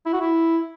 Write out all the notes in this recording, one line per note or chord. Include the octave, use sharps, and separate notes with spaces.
E4
F#4
E4